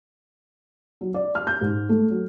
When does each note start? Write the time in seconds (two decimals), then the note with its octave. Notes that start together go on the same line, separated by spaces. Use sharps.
1.01 F#3
1.14 D5
1.35 F6
1.47 G6
1.61 G#2
1.89 A3
2.10 F#3